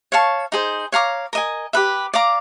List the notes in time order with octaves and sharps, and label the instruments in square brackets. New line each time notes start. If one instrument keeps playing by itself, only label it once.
[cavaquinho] C#5 F5 A5 C#6
D#4 G#4 C5
C#5 F5 A#5 D6
A#4 D#5 G#5
G4 B4 E5
D5 F5 A#5 D6